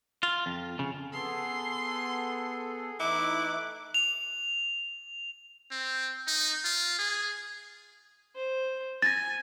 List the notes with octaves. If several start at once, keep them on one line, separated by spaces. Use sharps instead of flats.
F4
F2
C#3
B3 G#4 A4 C6
E3 A3 D#4 E4 D6 F#6
F7
C4
D#4
F4
G#4
C5
G#5 A6 A#6